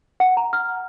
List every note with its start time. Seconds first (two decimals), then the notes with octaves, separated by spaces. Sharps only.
0.20 F#5
0.37 A#5
0.53 F6